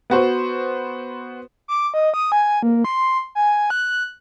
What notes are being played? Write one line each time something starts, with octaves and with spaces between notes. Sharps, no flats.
B3 F#4 C5
D6
D#5
D#6
G#5
A#3
C6
G#5
F#6